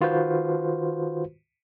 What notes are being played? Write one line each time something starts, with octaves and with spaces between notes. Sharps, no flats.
D#3 F4 F#4 B4 C5